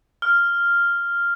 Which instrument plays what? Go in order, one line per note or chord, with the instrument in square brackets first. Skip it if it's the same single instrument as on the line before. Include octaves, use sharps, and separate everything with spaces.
[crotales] F6